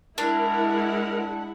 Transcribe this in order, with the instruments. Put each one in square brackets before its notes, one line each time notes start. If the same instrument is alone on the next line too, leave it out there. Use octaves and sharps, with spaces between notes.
[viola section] G#3 E4 F#5 [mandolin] D4 [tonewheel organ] A#4